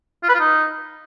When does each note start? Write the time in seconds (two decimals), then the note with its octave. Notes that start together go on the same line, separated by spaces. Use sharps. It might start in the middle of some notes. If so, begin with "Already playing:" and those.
0.23 F4
0.29 B4
0.34 F4
0.40 D#4